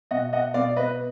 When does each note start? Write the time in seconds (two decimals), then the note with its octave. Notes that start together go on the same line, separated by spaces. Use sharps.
0.11 B2 D#5 F#5
0.33 D#5 F#5
0.54 B2 D5 F5
0.76 B4 D#5